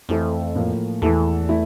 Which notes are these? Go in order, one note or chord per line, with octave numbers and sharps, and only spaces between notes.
F2 E3 A3 E4 A4 C5
A2 F3 A#3
E2 E3 A3 E4 A4
A3 E4